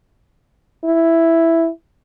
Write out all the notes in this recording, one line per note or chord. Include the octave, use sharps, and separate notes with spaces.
E4